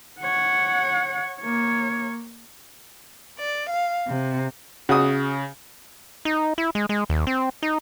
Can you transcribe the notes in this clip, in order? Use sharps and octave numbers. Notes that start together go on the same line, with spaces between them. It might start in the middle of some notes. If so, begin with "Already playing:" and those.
C#5 F#5
A#3 C#5
D5
F5
C3
C#3 F#4 D#6
D#4
E4
G#3
G#3
D#2
C4
D#4